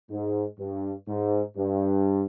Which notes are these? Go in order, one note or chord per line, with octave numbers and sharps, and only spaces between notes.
G#2
G2
G#2
G2